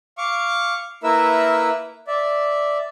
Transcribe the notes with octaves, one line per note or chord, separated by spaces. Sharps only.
F5 C#6 D6
A#3 E4 A#4 B4 E5 E6
D5 E5